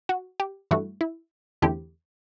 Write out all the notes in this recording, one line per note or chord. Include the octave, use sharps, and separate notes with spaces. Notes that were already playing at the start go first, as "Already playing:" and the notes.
F#4
G4
G2 E3 A3 E4 F#4
E4
E2 D3 A3 C4 E4 G4